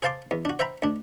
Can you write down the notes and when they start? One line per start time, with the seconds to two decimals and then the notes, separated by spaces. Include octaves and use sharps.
0.02 G#4 C5 F5 A5 C6 D6
0.31 E2
0.45 D4 F#4
0.59 C5 E5 G5 A#5 B5
0.82 D2 D4